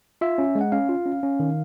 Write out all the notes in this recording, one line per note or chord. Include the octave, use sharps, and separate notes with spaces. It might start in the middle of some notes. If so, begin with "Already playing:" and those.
F4 E5
C#4
G#3
F#5
C#4 F5
F4
C#4
C#4
D#3